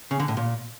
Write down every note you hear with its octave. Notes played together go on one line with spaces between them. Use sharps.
C#3
D3
A2
A#2